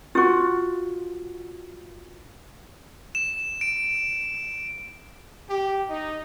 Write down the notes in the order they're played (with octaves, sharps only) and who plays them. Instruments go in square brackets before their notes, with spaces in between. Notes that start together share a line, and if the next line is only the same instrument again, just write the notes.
[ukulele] F4 F#4
[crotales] E7
D7
[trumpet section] G4
D#4